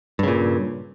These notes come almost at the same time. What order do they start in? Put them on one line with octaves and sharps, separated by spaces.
G2 C#3 A#2